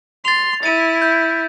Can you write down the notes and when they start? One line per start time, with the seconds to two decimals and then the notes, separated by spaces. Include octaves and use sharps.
0.25 C6 A6 F7
0.63 E4 A6 D#7
1.02 G6